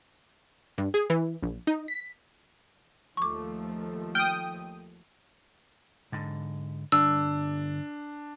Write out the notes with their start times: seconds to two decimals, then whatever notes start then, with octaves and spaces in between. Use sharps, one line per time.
0.78 G2
0.94 G#4
1.10 E3
1.43 A#1
1.67 D#4
1.88 B6
3.17 D#2 F3 A3 C#6 D6
4.15 G5 D#6 F6
6.12 G#2 D3
6.92 G1 D4 E6